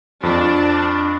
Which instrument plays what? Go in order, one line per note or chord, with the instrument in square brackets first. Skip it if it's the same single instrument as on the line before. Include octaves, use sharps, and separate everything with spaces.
[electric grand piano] F2 [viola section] D4